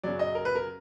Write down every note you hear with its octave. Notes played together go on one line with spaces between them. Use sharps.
F#2 C#3 F#3 D5
D#5
A#4
B4
A#4